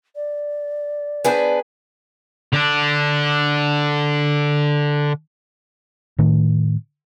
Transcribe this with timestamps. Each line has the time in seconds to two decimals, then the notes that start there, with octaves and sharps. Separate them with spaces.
0.15 D5
1.24 B3 D4 G#4 B4 C5 G#5
2.53 D3 D4
6.18 A2 D#3 A3